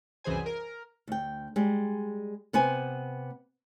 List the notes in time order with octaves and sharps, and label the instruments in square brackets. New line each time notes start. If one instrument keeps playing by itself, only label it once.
[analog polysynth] C2 F#2 E3 G#4 C5 G#5
A#4
[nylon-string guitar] D2 G5
G3 G#3
C3 B3 C5 G#5